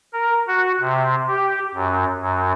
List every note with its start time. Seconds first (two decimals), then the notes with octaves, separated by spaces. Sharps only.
0.13 A#4
0.47 F#4
0.80 C3
1.27 G4
1.75 F#2
2.21 F#2